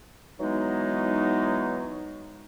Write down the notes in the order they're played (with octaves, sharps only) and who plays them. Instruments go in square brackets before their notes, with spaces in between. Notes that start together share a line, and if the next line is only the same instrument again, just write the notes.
[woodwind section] E3 F#3 G#3 B3 D#4